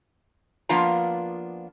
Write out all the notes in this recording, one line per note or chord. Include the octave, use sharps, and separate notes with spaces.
F3 A#3 B3 D4 F4 A#5